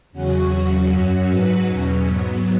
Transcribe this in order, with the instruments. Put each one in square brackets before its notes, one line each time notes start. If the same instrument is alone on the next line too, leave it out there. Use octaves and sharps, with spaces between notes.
[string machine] E2 C#3 F#3 C#4 F#4
E2 C#3 F#3
F#2 F#3
G#2 F#3 F#4 B4
E2 B2 F#3 C#4
G#2 F#3 B3